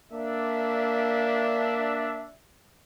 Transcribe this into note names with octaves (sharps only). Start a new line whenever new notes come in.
A#3 D4 E5